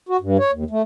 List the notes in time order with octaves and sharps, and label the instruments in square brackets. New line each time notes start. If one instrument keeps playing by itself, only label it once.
[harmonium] F#4
G2
C#5
D#2
A3